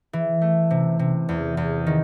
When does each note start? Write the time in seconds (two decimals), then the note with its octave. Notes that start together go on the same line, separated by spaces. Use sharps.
0.13 E3
0.42 A3
0.71 C3
0.99 C3
1.29 E2
1.57 E2
1.87 D#3